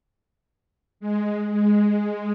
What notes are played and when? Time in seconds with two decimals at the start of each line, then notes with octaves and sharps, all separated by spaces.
1.00 G#3
1.52 G#3